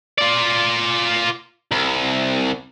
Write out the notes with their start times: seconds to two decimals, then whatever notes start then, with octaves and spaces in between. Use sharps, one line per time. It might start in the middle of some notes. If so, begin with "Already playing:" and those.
0.18 F4 D5
1.71 C2